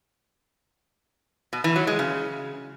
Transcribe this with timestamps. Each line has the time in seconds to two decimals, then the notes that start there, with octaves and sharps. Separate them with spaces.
1.53 B2
1.64 E3
1.76 F#3
1.87 G#3
1.99 C#3